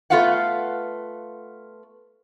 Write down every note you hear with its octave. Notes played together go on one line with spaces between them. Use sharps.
A3 B3 F4 B4 F5 F#5